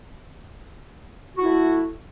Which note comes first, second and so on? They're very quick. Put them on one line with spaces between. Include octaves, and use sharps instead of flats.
F#4 E4 A3